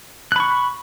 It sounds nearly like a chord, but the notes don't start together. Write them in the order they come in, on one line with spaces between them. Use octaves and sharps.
F#6 B5 C#6